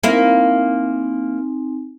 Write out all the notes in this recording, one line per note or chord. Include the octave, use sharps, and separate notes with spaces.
A#3 C4 D#4 E4 A#4 G#5